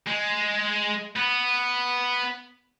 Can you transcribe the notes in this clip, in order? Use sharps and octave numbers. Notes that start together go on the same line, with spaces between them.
G#3
B3